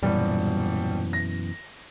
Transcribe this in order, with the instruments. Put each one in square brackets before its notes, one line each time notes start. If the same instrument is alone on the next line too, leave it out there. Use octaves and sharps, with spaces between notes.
[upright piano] D#1 G3 [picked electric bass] F#2 B2 E3
[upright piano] A#6